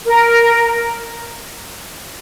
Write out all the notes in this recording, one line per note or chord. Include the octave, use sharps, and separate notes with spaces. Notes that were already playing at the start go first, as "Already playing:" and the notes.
A#4